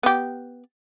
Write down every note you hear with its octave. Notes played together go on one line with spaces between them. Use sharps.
B3 G4